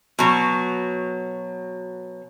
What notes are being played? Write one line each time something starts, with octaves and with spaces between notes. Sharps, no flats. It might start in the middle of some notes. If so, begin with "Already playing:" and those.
B2 F#3